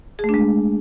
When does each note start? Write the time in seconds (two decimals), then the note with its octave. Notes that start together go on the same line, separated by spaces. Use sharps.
0.19 G#4
0.24 A3
0.29 D4
0.34 G#3